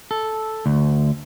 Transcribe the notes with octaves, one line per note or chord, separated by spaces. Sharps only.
A4
D2